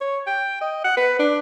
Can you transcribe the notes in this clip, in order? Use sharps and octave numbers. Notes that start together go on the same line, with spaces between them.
C#5
G5
D#5
F#5
B4
D4